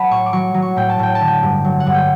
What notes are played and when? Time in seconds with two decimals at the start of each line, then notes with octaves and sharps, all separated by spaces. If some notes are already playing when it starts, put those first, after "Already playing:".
Already playing: F#3 F#5 A5 B5
0.11 A2 C#6
0.26 D6
0.33 F#3 C#6
0.54 F#3
0.62 C#6
0.76 A2 G5
0.89 A5
0.99 A2 G5
1.15 A5
1.21 D3
1.27 G5
1.43 G2
1.65 F#3
1.80 F#5
1.86 G2
1.94 G5